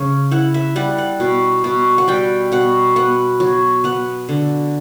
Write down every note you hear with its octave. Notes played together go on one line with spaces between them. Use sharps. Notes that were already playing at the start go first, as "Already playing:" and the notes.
Already playing: C#3 C#4
E4 F#5
E5
G3 F#5
F#5
B2
B2
F#5
G3 G5
B2 F#5
B3 F#5
F#3
B3 F#5
D3